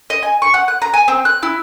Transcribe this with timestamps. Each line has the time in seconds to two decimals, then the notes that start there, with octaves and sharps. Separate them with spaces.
0.10 D#5
0.23 G#5
0.42 C#6
0.54 F#5
0.68 F#6
0.82 A#5
0.94 G#5
1.08 C4
1.25 F#6
1.43 E4